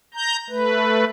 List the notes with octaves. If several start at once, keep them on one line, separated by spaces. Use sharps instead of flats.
A#5 G6
A3 B4